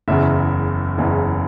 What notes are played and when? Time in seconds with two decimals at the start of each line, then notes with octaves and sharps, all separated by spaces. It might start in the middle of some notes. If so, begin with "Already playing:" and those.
0.08 F#1 E2 C#3 E5
0.98 F#1 E2 C#3